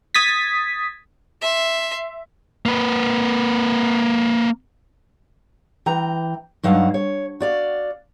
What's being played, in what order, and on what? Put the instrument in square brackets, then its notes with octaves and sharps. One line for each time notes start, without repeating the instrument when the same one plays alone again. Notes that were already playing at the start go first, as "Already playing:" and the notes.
[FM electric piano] D#6 G#6 A6 B6
[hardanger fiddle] E5 C6
[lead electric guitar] A#3 B4
[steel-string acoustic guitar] E3 G5 A#5
G2 F#3 D#4 F5 F#5 A5
C#5
F#4 D5 F5